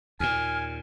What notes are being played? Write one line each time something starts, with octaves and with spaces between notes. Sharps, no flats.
D#2 A#2 G#5 F6